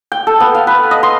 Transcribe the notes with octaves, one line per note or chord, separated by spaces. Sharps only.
G5
A4
B3
F5
B4
D#5
C6